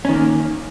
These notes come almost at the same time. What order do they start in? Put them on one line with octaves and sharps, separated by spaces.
C#4 D#3 A#3